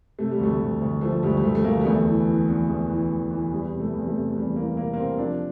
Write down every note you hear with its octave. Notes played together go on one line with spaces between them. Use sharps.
C3 A3
G3
D2 A3
D2
D2
F3 A3
D2 G3
G3
D2 A3
A3
D2 A#3
G3
E2 A3
E3
E3
E2
E2
E3
E2
E3
E2 G3
C3
A3
E2
A3
C3
E2 G3
E3 A#3
C3 A#3
A#3
C3 C4
F3 D4